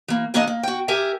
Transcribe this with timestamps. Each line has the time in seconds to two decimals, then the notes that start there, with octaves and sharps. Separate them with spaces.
0.08 E3 A#3
0.34 E3 A#3 D4 A4 A#4 D#5
0.48 A#3
0.63 F#4 G5
0.88 G4 A#4 E5 G#5